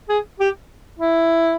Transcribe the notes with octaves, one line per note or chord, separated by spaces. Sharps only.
G#4
G4
E4